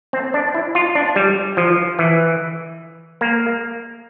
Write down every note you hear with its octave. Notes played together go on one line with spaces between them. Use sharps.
C4
D4
E4
F4
D4
G3
F3
E3
A#3